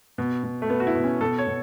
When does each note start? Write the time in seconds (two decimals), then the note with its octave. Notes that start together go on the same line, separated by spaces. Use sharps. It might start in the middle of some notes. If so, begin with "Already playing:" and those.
0.18 B2
0.44 B2
0.62 A3
0.69 B2 B3
0.80 F#4
0.87 E4
0.95 B2
1.04 C#4
1.21 B2 A4
1.38 C#5
1.47 B2